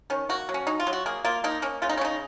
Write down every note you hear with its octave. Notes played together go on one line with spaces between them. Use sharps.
D#3 C#4
A#3 F#4
F#3
C#4
F#3 D#4
F4
F#3
F#4
A#3 G#4
A#3 F4
A#3 D#4
A#3 C#4
C#3 F4
D#4
C#4
C#3 D#4